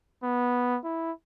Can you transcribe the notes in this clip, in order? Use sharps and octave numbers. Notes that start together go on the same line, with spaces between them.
B3
E4